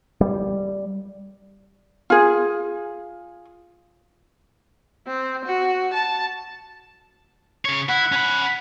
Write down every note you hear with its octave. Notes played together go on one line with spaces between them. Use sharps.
G3
F4 G#4
C4
F#4
A5
C#3 C#5
E4 F#5
C#4 B5